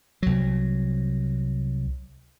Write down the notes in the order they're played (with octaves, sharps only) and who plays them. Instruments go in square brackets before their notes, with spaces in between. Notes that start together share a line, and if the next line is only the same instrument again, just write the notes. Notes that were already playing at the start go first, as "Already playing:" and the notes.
[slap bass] C2 F#3